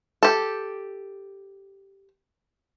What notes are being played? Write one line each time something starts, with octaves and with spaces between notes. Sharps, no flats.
G4 A4